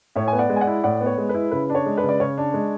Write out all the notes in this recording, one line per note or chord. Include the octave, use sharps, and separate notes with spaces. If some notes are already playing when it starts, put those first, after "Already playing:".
A2 C#5 E5
B3 G#5
D5 F#5
G#3
G#5
D5 F#5
E4
A2 D5 F#5
B3
C#5
G#3
B4
E4
C#3 B4
D4
C#5
G#3
B4 D5
C#3
D5
C#3 C#5
D4
G#3